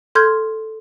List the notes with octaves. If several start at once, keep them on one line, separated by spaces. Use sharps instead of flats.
A4 C6 F6 G6 G#6